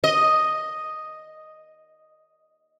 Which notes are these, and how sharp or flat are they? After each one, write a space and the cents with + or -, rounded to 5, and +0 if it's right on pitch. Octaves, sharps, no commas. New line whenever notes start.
D#5 +0